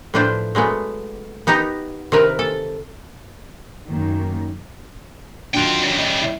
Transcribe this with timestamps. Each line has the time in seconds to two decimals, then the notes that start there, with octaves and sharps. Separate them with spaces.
0.14 A2 F3 D4 B4 C5 G5
0.55 F#3 G#3 A3 B3
1.47 B3 D#4 G4 A#5
2.12 C3 D#3 A#4 B4
2.39 A4
3.87 F#2 D#3 A#3
5.54 D#3 F#3 D4 F4 G5
5.83 C#3 G3
5.99 D#5
6.22 E4